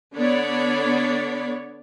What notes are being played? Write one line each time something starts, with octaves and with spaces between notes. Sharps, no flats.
D3 B3 D4 C#5 D5 B5